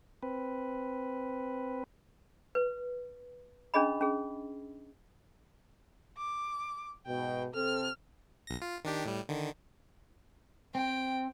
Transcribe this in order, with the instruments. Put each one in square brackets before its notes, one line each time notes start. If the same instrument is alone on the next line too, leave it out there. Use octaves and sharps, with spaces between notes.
[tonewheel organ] C4 B4
[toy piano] B4
C#4 D4 G#4 D#5 B5
C#4 G#4
[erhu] D6
[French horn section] G#2 B2 [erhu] G5
[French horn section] C3 C4 A4 [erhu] F6
[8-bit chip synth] B1 A#6
F4
D#3 D4 G4
A2 G3
D3 D#3
[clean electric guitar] C4 [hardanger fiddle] G5